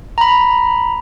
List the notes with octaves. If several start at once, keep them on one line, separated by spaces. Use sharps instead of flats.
A#5 B5